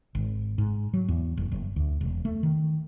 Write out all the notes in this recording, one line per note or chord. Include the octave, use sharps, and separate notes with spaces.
G#1
G#2
F#3
E2
F#1
F#1
D2
E1
A3
D#3